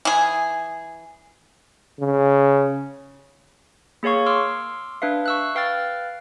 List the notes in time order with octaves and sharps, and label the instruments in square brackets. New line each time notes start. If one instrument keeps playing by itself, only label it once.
[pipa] E3 G#4
[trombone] C#3
[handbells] A#3 G#4 C#5 F5 C#6
C6 D6 E6 F6
D4 B4 E5 F5
C#6 E6 F#6
B4 F5 G5 F6 F#6 A6